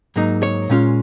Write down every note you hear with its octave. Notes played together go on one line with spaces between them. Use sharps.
G#2 F#3 A#3 D#4
C#5
A#2 G#3 C#4 F4